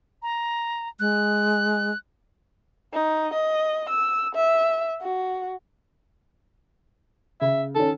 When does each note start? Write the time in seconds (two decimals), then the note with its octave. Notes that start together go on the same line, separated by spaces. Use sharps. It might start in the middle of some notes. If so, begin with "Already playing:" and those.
0.22 A#5
1.00 G#3 F#6
2.93 D#4
3.34 D#5
3.89 E6
4.35 E5
5.02 F#4
7.41 C#3 E5
7.76 D#3 C#4 A4